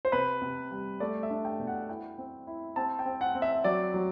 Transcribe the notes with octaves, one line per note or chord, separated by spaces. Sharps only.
C5
C3 B4
C3
G3
A3 D5
E5
D4
G5
B2
F#5
E4 G5
C4
E4
C4 A5
G5
C4
F#5
C4
E5
F#3 D5
F#3